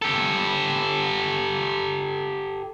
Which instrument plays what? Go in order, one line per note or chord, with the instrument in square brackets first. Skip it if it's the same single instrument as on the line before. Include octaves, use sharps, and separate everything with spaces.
[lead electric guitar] G4 A4